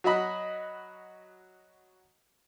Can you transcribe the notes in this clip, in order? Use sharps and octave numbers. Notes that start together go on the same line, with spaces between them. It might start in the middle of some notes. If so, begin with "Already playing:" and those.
F#3 F#4 D#5 B5